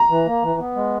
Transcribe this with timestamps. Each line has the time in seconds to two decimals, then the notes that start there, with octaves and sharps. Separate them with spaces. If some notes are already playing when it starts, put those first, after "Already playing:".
Already playing: A#5
0.10 E3
0.27 A#3
0.43 E3
0.59 B3
0.76 G#3